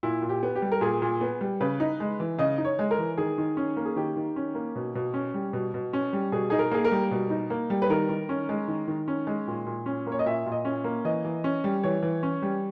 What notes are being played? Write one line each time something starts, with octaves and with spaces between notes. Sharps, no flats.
A#2 E4
A#2
G4
B3
G4
G3
A#4
A#2 G#4
A#2
B3
G3
C#3 B4
D#4
G#3
E3
C#3 D#5
D#4
C#5
G#3
A#4
E3
D#3 G#4
D#3
C#4
A#3
G#4
D#3 G4
D#3
C#4
A#3
B2
B2
C#4
G3
B2
B2
C#4
G3
B2 G#4
D#4 G#4
A#4
A#3 G#4
A#4
G3
B2
D#4
A#3
G3
B4
D#3 A#4
D#3
C#4
G#3
D#3
D#3
C#4
G#3
A#2
A#2
C#4
A#3
C#5
D#5
A#2 E5
A#2
D#5
C#4
A#3
E3 D#5
E3
C#4
G3
E3 C#5
E3
C#4
G3